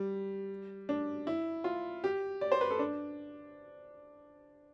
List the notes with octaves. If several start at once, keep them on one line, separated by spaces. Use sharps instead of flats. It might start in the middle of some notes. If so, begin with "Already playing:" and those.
Already playing: G3
D4
E4
F4
G4
D5
C5
B4
A4
D4